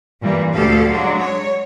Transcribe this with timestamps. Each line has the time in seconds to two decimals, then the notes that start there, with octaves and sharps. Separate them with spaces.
0.21 G2 A#2 E3 G3
0.53 D2 G4 A4 F5
0.88 F#3 G#3 D4
1.17 C#5